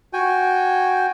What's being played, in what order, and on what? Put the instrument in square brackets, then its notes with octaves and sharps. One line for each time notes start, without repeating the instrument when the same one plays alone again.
[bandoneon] F#4 G5 G#5